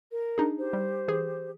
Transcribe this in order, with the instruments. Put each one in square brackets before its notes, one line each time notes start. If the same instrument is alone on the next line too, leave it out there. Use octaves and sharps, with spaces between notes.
[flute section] A#4
[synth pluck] D4 D#4 G#4
[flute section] G4 C5
[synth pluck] G3
E3 G#4